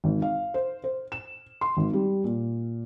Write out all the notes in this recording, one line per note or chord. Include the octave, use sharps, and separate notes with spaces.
G#1
F5
C5
C5
E7
C6
G#1
G3
A#2